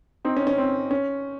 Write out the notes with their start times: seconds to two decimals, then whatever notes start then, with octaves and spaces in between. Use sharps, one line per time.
0.25 C4 D#4
0.37 C#4
0.47 C#4
0.58 C4
0.91 C#4